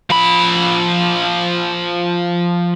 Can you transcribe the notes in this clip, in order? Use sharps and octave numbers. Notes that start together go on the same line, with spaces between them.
F3 B5